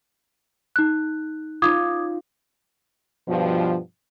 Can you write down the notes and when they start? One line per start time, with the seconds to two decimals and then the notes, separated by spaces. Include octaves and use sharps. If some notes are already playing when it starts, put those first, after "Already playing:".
0.76 D#4 F#6
1.62 C#4 D#4 F4 D6 D#6 G#6
3.28 G2 B2 F3